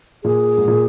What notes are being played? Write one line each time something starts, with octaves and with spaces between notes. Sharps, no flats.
A#2 G#4
G#2
A#2